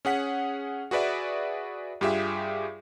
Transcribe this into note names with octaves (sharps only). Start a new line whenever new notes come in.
C#4 G#4 F#5 B6
F#4 G#4 B4 D5 E5
G2 F4 G4 G#4 E5